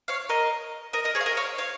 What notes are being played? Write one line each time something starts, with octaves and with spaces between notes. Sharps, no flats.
C#5 F5
A#4 D#5
A#4 D#5
A#4 D#5
G#4 C#5
F5
A#4 D#5
C#5 F5
C#5 F5